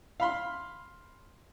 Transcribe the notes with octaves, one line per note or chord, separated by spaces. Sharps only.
F5 B5 C6